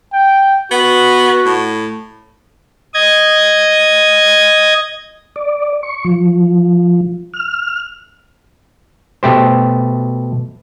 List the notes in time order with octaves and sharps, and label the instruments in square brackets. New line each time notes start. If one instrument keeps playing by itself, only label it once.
[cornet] G5
[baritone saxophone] B3 [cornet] F#4
[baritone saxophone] A2
[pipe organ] D#5 G#6
[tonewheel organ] D5
C#6
F3
F6
[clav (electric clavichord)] B2 A3 G4 C5